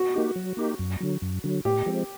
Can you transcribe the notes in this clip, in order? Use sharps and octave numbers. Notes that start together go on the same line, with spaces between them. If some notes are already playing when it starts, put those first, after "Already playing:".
Already playing: F#4
A#3 D#4 G4
F#3
A#3 D#4 G4
F#2
D3 F#3
F#2
D3 F#3
A2 G4
F3 G#3 C4